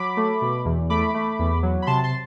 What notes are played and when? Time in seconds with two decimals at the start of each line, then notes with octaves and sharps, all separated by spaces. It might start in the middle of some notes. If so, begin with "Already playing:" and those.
Already playing: F#3 B5 D6
0.17 A3
0.42 B2
0.65 E2
0.90 A3 B5 D6
1.14 A3
1.39 E2
1.63 F#3
1.82 B5
1.87 C3 A5 C6
2.04 A5 C6